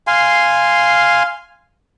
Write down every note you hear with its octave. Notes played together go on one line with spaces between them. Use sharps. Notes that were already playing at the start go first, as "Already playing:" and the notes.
F5 G#5 C6